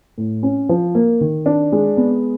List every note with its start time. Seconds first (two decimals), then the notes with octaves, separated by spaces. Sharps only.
0.18 A2
0.43 C#4
0.69 F3
0.95 A#3
1.21 D#3
1.46 D4
1.72 G#3
1.97 B3